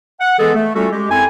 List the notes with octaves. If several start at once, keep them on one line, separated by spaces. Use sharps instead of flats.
F#5
E3 G#3 B3 G#4 A4
A3
G3 A3 C#4 F4 F#4 A4
G#3 G4
F#2 C4 E4 A4 G#5